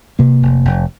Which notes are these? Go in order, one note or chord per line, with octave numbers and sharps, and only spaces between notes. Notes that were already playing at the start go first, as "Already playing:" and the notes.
C3 A#3
F1
F1